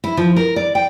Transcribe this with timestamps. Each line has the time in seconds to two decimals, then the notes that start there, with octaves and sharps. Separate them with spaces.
0.04 E4
0.17 F3
0.36 A#4
0.56 D5
0.75 G5